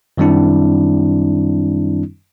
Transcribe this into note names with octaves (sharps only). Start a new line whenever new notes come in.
F#2 D#3 G3 C4 D4 E4